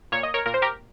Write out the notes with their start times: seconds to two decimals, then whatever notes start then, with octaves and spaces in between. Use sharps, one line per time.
0.12 A#2 C#5
0.23 D#5
0.34 A#4 C#5
0.46 A#2 A#4
0.54 C5
0.62 G4 A#4